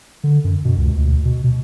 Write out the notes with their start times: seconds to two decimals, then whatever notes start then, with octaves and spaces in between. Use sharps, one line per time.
0.24 D3
0.44 F#2
0.65 B2
0.77 C#2
0.94 D2
1.25 B2
1.44 B2